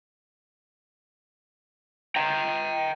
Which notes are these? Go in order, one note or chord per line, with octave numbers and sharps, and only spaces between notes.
G5 A#5